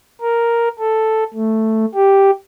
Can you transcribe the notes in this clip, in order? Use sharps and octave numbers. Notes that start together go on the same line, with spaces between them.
A#4
A4
A3
G4